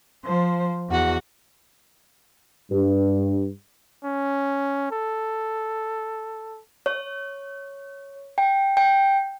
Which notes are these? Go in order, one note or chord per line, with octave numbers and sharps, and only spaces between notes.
F3 C5
E2 F#4 F#5
G2
C#4
A4
C#5
G5
G5